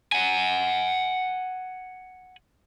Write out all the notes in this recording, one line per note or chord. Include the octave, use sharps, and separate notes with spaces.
F#5 G#5